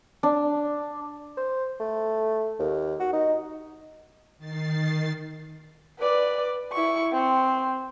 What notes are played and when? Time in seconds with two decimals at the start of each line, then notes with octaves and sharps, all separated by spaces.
0.23 D4
1.37 C5
1.80 A3
2.59 D#2
3.00 F#4
3.13 D#4
4.38 D#3 A6 C7
6.00 B4 D5
6.72 E4 C#6
7.13 C4